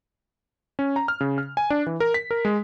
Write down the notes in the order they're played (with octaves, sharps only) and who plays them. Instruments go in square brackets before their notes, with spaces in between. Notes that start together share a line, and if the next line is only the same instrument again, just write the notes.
[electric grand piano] C#4
A#5
F6
C#3
F6
G#5
D4
E3
A#4
B6
A#4
G#3